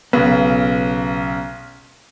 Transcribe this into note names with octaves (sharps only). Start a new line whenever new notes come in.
B1 C#3 B3